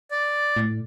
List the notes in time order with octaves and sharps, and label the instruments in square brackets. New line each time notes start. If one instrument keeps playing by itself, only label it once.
[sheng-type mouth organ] D5
[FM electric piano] A2